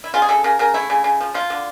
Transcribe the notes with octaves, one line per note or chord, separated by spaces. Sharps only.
E4
C#3 F4
G#4
C#3 A4
C#3 A#4
C#3 A#4
A3 E4
C#3
C#3
F3
F3 F4
D3